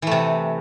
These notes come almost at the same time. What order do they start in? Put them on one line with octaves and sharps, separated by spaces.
E3 A3 C3